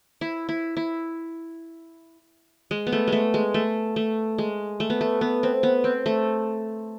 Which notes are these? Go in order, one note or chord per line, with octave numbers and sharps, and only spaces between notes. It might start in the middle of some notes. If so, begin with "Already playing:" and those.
E4
E4
E4
G#3
B3
A3
G#3 A3
G#3
A3
A3
G#3
A3
B3
A3
B3
C4
B3
C4
A3